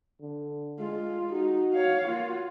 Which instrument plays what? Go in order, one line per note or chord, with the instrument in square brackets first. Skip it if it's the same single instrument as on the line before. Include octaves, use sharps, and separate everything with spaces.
[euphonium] D3
[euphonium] G#3 [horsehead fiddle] F4
[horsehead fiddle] D#4 [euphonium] F#4
[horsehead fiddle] C#5 F5
[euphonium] A#3 [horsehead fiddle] F4 F#4